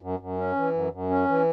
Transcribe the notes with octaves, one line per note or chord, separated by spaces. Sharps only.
F#2
F#2
C#4
E3
F#2
F#2
C#4
E3